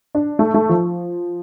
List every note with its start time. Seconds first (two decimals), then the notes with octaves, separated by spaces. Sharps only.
0.15 D4
0.39 A3
0.54 A3
0.69 F3